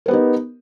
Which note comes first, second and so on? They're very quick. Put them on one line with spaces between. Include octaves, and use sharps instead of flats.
A#4 B3 G4 D#4